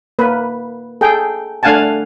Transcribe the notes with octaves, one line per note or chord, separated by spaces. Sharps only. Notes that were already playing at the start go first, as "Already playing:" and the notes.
A#3 B4
G#4 A4 G5
A3 D4 F5 F#5 G#5 A5